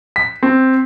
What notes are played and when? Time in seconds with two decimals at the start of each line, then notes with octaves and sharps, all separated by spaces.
0.16 B6
0.43 C4